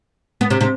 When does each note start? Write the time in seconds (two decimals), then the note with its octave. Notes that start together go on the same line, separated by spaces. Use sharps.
0.41 B3
0.50 C3
0.61 C3